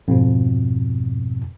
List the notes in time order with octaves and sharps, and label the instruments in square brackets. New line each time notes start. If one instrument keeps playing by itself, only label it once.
[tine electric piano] F2 G#2 B2